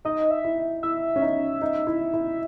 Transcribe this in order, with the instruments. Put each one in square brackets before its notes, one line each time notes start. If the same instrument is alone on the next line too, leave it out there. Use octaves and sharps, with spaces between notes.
[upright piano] D#4 [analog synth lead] D#5
[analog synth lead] E5
[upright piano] E4
[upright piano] E4 [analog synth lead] E5
[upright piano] C#4
D#4
D#4
E4
E4